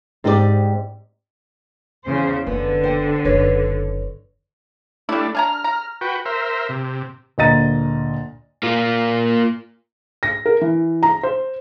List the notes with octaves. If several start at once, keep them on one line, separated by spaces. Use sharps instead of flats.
G#2 C4 D#4 G4 B4 D5
E2 C#3 C5
F#1 D3 B3
C5 G5
F#1 D#4 B4 C#5
G3 A3 D4 E4
D4 G#5 A#5 F6
A#5
F#4 B4 G5
A#4 C5 E5
C3
D2 A#2 D#5 A#5 A6 D#7
A#3 F4
A#6
A#4
E3
A#5
C5